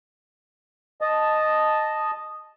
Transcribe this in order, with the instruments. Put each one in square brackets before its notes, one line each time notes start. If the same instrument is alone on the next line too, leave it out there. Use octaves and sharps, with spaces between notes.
[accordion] D#5 A5